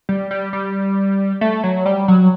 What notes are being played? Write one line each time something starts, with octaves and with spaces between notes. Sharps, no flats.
G3
G3
G3
A3
F#3
G3
F#3